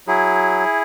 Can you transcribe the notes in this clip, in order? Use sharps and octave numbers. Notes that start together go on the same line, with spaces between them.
F#3 E4 G#4